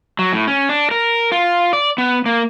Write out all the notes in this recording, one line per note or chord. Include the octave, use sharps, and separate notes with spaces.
F#3
A2
C#4
D4
A#4
F4
D5
B3
A#3